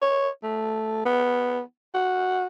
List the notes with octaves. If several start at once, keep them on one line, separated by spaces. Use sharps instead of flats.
C#5
A3
B3
F#4